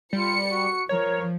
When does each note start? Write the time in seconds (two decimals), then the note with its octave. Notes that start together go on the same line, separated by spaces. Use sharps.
0.13 G3 F4 C#7
0.50 F#4
0.89 F3 A#4 C#5